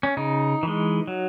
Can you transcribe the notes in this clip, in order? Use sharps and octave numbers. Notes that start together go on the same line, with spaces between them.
C#4
C#3 D#4
E3 G#3
F#3